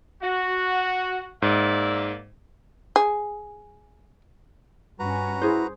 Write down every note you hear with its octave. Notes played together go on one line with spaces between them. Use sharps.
F#4
G#2 A#3 D5 E5
G#4
G2 C#4 F#4 B4 A#5
E4 G#4 C5